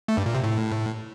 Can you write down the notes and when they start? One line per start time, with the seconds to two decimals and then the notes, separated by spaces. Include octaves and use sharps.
0.08 A3
0.17 G2
0.26 A#2
0.35 C3
0.43 A2